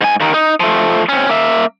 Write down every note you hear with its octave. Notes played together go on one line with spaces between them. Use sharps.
G#2 G#5
D#2 D#3
D#4
F3 A3
C4 C#4
A#3 E5